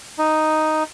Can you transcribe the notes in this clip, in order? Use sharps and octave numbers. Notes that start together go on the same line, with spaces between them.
D#4